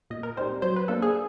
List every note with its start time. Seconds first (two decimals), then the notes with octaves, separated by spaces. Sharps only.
0.10 A#2 D#5
0.23 A#4
0.37 G3 C4 D#4 C5
0.62 F#3 C5
0.76 B4
0.88 A#3 D4 A4
1.02 G#4